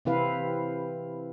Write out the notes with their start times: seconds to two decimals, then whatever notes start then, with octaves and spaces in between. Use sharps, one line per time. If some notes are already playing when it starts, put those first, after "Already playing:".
0.05 C3 E3 C4 E4 B4 F5